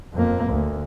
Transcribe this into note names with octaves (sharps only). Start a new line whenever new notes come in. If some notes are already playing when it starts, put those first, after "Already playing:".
F2 A#3
D2